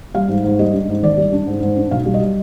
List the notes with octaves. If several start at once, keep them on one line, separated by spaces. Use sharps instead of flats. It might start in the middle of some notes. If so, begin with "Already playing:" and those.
G3 F5
G#2
G#2
G3 D#5
D4
G#2
G#1 D5
G3
D4
G#2
G#2
D4
B1 F5
G3
D#5